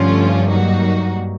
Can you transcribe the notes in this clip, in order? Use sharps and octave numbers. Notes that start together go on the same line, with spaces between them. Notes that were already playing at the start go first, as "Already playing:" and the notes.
Already playing: G2 D3 F3 A3 C#4 F4
F#3 A#3 D#4 F#4